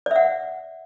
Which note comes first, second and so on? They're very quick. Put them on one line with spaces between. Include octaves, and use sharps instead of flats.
D5 E5 F#5